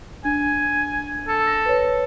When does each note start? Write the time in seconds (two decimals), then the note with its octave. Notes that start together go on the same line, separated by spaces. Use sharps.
0.25 D4 G#5
1.28 A4
1.47 A#6
1.66 B4 C#5